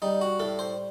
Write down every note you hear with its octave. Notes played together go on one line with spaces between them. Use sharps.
G3 D#4
F#4
A2 A4
C5